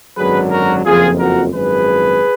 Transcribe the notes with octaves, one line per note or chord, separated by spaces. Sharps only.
G#1 F#2 D3 F#3 G#4 B4
F#4 A#4
F#1 F2 F3 F4 G#4
F#4 A#4
G#1 F#2 F3 G#4 B4